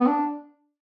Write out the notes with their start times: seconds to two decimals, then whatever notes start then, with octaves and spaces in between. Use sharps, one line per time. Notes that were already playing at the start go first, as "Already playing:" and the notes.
0.01 B3
0.07 D4